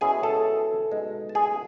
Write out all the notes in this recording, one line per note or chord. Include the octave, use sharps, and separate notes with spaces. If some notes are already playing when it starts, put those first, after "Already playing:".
B2 G#3 C#4 E4 G#4 G#5
A4 A5
B2 G#3 D#4
A5
G#4 G#5